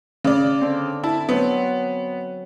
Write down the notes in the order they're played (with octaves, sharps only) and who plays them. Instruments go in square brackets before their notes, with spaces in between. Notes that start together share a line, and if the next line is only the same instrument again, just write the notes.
[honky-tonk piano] C#3 D5
[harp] D3 C4
[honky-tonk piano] E4 [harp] A5
[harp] F#3 C4 [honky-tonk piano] B3